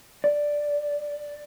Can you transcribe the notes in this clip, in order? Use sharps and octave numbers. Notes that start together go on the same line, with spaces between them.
D5